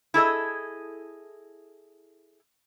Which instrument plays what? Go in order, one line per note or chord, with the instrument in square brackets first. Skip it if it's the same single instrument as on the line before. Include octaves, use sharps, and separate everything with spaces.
[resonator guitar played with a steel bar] E4 G#4 A4 D#5